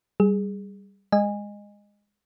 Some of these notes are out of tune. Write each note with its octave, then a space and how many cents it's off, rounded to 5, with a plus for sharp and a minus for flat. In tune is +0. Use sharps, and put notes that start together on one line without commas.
G3 +0 G#4 +0
G#3 -15 D#5 -15 G#5 -20